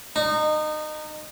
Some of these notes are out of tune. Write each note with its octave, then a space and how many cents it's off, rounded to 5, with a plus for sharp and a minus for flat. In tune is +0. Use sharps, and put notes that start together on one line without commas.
D#4 -25